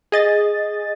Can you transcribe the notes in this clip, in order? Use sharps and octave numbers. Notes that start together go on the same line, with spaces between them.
G#4 D#5 A6